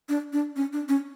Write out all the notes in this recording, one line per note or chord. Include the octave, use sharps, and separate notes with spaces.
D4
D4
C#4
D4
C#4